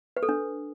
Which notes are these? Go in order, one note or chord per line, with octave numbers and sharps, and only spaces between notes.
B4
A4
D4